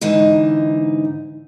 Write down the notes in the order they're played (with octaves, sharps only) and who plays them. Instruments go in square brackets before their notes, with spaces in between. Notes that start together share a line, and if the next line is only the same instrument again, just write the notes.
[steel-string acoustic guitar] G#2 D3 E3 D#4